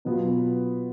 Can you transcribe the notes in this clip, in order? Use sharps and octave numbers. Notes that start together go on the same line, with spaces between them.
B2 F#3 B3 F4